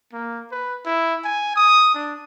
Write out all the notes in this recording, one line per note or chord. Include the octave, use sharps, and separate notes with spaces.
A#3
B4
E4
G#5
D#6
D4